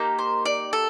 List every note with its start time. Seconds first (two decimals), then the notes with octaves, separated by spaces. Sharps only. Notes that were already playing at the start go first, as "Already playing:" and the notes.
Already playing: A#3 D#4 G4
0.19 C5
0.45 D5
0.73 A4